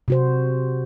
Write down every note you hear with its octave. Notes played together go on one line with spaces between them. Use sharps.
C3 F#4 C5